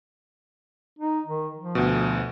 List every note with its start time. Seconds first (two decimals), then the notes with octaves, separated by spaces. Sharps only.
0.99 D#4
1.26 D#3
1.58 F3
1.75 D2 B2